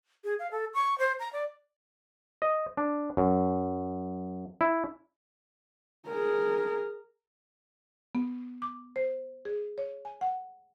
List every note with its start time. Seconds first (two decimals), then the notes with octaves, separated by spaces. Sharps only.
0.24 G#4
0.39 F5
0.51 A4
0.74 C#6
0.98 C5
1.19 A#5
1.33 D5
2.42 D#5
2.77 D4
3.17 F#2
4.61 E4
6.07 G#4 A#4
8.15 B3
8.62 D6
8.96 C5
9.45 G#4
9.78 C#5
10.05 G#5
10.21 F#5